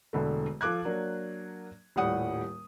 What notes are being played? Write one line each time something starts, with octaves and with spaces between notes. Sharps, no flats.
E1 D3 A3
F3 A4 D6 F#6 G#6
F#3 A#3 D4
D#1 A2 G3 F#5 D#6